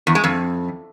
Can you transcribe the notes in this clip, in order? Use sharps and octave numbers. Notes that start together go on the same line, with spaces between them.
E2
G#3
F2